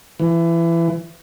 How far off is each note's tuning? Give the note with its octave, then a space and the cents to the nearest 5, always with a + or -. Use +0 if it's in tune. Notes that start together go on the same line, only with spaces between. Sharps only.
E3 +25